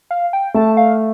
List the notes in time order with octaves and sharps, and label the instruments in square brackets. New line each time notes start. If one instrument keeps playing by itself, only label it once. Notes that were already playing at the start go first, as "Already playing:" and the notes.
[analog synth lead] F5
G5
[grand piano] A3 [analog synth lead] A5
[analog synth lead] F5